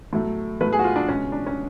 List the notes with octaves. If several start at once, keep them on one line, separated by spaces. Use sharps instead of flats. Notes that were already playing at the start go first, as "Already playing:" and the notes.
A2 F#3 A3
A2 F#3 A3 B4
G#4
F#4
F4
D4
C#2 B2 G#3 C#4
D4
C#4